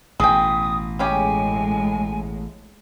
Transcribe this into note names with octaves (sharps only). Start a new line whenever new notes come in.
A1 B2 G#4 G5 D#6
A2 C#3 G#3 C#4 G4 G#5